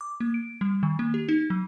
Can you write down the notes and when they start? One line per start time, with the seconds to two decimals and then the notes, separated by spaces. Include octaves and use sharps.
0.01 D6
0.20 A#3
0.34 D7
0.61 G3
0.83 D#3
0.99 A#3
1.14 G4
1.29 D#4
1.50 F#3